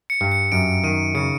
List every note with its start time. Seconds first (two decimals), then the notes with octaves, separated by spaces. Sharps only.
0.10 C#7
0.21 G2
0.32 C#7
0.52 F#2 D7
0.84 D#3 D#7
1.15 C#3 C#7